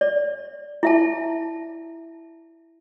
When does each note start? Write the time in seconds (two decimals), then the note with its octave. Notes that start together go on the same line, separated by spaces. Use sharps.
0.01 D5
0.83 E4 E5 A5